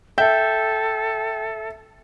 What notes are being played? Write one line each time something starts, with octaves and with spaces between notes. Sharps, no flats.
A4 E5 G5 G6